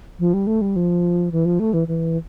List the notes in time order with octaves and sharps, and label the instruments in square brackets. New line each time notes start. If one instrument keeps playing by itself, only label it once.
[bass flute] F3
G3
A3
G3
F3
E3
F3
A3
E3
E3